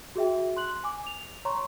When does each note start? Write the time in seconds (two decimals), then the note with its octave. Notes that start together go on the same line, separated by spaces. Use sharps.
0.16 F#4 G#4 E5 G5
0.57 C6 F#6 F#7
0.84 G#5 D6
1.07 F7
1.45 C#5 A#5 C6 C#6